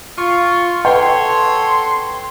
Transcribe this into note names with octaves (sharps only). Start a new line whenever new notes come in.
F4 C#6
A4 B4 C#5 F#5 G5 C6